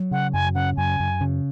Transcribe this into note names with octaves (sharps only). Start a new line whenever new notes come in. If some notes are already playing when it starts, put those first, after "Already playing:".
Already playing: F#3
C#3 F#5
F#2 G#5
C#3 F#5
F#2 G#5
F#2
C#3